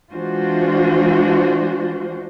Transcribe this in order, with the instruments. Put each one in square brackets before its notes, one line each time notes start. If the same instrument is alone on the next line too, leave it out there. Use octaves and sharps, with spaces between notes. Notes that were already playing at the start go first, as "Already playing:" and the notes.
[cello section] E3 G#3 D4 F4 F#4 C5